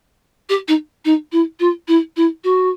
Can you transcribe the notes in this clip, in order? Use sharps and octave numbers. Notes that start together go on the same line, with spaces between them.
G4
D#4
D#4
E4
F4
E4
E4
F#4